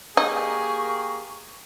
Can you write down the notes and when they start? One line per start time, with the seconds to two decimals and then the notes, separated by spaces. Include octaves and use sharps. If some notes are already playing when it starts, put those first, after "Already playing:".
0.17 A#3 D#4 G4 G#4 C#6